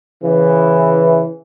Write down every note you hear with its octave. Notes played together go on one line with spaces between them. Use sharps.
C#3 E3